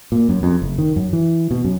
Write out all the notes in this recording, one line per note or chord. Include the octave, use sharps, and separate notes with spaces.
A#2
F#2
F2
F#1
D#3
F#2
E3
B2
F#2